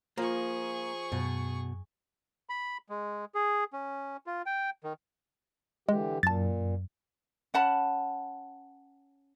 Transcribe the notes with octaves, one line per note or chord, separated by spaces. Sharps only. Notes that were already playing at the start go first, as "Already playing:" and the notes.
F3 A#3 G#4 A#5 C#6
F#2 B2
B5
G#3
G#4
C#4
F4
G5
D#3
D3 E3 G#3 G4
F#2 A#2 A5 A6
C#4 F#5 A5 B5